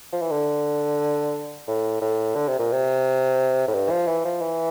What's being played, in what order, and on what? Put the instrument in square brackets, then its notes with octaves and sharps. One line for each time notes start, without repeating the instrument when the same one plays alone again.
[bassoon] F3
E3
D3
A2
A2
D3
C3
A#2
C3
A2
G2
F3
E3
F3
E3